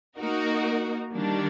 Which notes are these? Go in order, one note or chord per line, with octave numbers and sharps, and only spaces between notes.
A#3 D#4 F#4 A#4
D#3 G3 A#3 D4